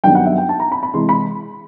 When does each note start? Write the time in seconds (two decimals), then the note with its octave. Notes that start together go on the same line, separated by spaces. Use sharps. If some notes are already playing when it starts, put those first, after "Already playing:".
0.04 G2 D#3 F#3 B3 G5
0.15 F#5
0.26 E5
0.38 G5
0.49 A5
0.60 A#5
0.72 B5
0.83 B5
0.94 C3 E3 G#3 C6
1.09 B5